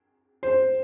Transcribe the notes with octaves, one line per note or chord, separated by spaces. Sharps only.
C5